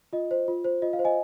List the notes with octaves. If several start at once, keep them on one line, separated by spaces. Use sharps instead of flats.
F4 D#5
C5
F4
C5
F4 D#5
F5
C5
D#5 G#5